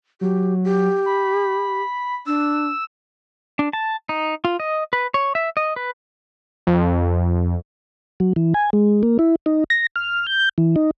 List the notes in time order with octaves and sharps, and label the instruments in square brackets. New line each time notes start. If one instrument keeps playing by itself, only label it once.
[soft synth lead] F#3 [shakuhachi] G4
[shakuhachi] G4
[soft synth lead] B5
[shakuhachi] D4 [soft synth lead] E6
[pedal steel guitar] D4
A5
D#4
F4
D#5
B4
C#5
E5
D#5
B4
[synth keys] F2
[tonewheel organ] F#3
E3
G#5
G#3
A#3
E4
D#4
A#6
F6
G6
E3
D#4